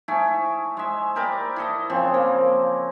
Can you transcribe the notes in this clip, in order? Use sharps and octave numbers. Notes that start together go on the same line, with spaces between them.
A3 E4 G#4
G#3 E5
G4 A#4 B4 D5
E4 A4 D#5
C#3 F3 C4
A#3